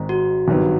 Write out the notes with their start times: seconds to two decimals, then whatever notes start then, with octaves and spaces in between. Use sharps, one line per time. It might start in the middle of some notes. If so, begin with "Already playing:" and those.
Already playing: G#1 G#2 D#3
0.09 F#4
0.48 G#1 G2 D#3 F#3 B3